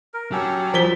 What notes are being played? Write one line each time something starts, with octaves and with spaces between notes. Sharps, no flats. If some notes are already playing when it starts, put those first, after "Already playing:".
A#4
F#3 C#4 G4 A4
F3 B6 G7